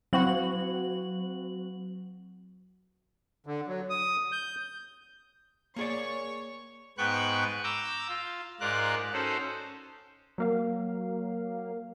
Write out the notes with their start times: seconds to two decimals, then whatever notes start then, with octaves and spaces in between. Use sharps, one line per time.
0.13 F#3 C4 F#4 F#7
3.47 D3
3.67 F#3
3.90 D#6
4.32 G6
5.76 A#3 G#4 C#5 D5 C#6
6.98 G#2 B3 B4 G5 C#6 F#6
7.64 A#5 D6 E6 G6
8.08 F4
8.60 G#2 F4 A#4 D5 F#6
9.13 C#4 D#4 F#4 A4 C5
10.38 F#3 A#3 F5